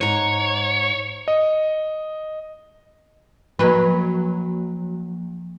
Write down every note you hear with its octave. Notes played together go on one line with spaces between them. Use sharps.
G#2 C#5 A#5
D#5
F3 F#3 A#3 B4